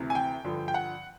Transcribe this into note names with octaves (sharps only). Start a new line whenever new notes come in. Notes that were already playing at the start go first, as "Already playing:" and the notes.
Already playing: D2 C3 E3
G#5
G5
G2 D3 F3
G5
F#5